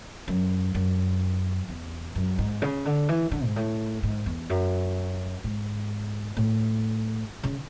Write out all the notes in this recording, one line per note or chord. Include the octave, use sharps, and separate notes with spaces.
F#2
F#2
E2
F#2
G#2
C#3
D3
E3
D3
G#2
A2
G#2
E2
F#2
G#2
A2
C#3